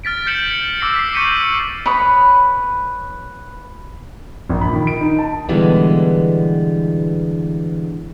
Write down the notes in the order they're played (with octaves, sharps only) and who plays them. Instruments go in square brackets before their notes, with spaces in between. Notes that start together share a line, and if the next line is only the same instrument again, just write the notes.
[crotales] F6 A6 B6 D7
G6 B6 C#7 D7 E7 F#7
C#7
D6 E6 A#6 C7 C#7
B6 C7
C#6 G6 B6 C#7 D#7 F#7
[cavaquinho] B4 C#5 B5 D#6
[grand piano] A#1
B5
D#3
D7
D#4
A5
[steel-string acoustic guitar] B2 D3 E3 G3 G#3 B3